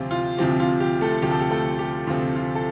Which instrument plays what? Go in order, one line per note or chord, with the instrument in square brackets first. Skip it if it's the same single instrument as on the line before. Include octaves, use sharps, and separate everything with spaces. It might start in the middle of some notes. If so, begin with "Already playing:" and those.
Already playing: [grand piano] D2 C3 F3 C4 F4 G4
F4
D2 C3 F3 C4 G4
F4
G4
A3 A4
D2 C3 F3 C4 G4
A4
G4
A3 A4
G4
D2 C3 F3 C4 F4
F4
A4